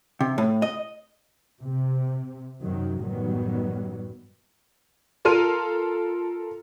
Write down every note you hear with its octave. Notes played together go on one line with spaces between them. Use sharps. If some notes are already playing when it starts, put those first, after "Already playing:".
C3
A2
D#5
C3
F#2 C3 D#3 F#3
A1 F#2 D#3 F#3 G3 B3
F4 A4 A#4 C6 F6 D#7